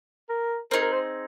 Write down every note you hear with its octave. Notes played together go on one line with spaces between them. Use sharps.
A#4
C4 D#4 G#4 A#4
A#4
C5